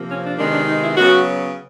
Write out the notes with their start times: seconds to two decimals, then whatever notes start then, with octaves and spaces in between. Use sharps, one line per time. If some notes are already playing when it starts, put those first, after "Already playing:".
Already playing: C3 F3 A#3
0.09 C#4
0.23 D4
0.38 C3 D#3 G#3 B3 D4
0.52 D4
0.67 D#4
0.82 E4
0.97 C#3 F#3 B3 F#4